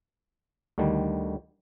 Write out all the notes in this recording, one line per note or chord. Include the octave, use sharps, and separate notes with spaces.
D2 D3 D#3 G3